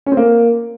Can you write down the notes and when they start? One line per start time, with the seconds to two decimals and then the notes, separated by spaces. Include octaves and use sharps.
0.06 C#4
0.12 C4
0.17 A#3